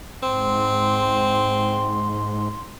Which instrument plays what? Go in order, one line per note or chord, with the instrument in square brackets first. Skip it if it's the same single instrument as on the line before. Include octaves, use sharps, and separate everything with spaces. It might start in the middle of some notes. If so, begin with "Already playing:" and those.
[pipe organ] G#2 [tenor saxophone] C4 [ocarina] C6